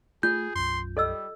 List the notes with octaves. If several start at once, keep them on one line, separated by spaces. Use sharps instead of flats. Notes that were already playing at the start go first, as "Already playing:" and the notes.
A3 F4 G#4 G6
B1 F#2 C6
G3 A4 D#5 E6